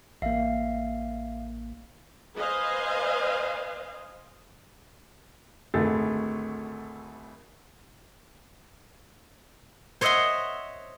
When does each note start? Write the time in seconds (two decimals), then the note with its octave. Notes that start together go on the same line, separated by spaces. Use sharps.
0.22 A1 A#3 E5 F5 C7
2.36 B4 C5 D#5 F5 G#5
5.74 G#1 D2 A3 G#4 A4 A6
10.01 C5 C#5 D#5 E5 F#5 C6